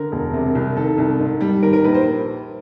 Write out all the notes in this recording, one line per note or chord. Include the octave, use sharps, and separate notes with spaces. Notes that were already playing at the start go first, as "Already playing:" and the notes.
Already playing: D3 A#4
E1
C3
C2
D#3 A4
C2
G#2
G3
D#3 A#4
A#4
A#1 B4
C5